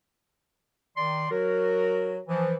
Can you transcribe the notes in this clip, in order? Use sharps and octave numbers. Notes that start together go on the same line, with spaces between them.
D#3 D5 C6
F#3 F#4 A#4
E3 F3